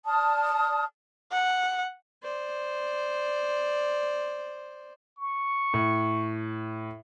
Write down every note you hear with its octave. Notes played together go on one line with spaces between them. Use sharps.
D5 A5 D#6 F6
F#5
C5 D5
C#6
A2